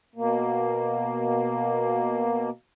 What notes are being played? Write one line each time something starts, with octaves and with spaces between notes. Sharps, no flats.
B2 A#3